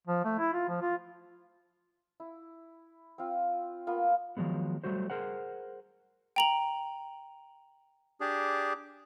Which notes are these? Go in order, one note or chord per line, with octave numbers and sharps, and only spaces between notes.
F3
A3
E4
F4
F3
F4
E4
C4 F4
A#3 B3 F4
D#3 F3 F#3 G#3 B3
F#3 G3 A3 F#4 C5
G#4 A#4 C5 F#5
G5 A#5 F#7
D4 G4 G#4